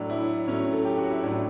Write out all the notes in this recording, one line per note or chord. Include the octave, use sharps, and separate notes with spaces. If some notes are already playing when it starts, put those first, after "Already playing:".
Already playing: A2 F#3 D4
E4
A2 F#3 C#4
A4
G4
F#4
E4
A2 F#3 D4